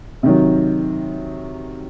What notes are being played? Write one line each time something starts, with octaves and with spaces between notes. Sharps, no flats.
C3 D#3 F#3